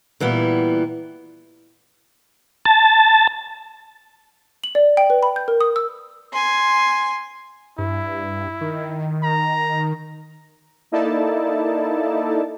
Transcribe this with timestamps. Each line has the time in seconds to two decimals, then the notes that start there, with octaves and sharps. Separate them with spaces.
0.20 A#2 E3 G3 B3
2.65 A5
4.64 F#7
4.75 D5
4.97 G5
5.10 B4
5.23 B5
5.36 G6
5.48 A#4
5.61 D#6
5.76 E6
6.33 G#5 C6
7.78 G2 E4
8.61 D#3
9.23 A#5
10.92 A#3 D#4 E4 A4 D5 A5